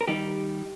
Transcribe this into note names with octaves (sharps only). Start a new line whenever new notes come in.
A#4
D#3 G3 D#4 G4